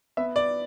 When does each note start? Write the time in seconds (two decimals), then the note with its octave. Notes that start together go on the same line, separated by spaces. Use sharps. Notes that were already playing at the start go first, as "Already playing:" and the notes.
0.17 B3 E5
0.36 D5